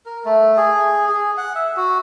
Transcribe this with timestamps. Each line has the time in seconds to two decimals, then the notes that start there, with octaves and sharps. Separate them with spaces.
0.06 A#4
0.25 A3
0.57 G#4
1.08 G#4
1.37 F#5
1.55 E5
1.76 F#4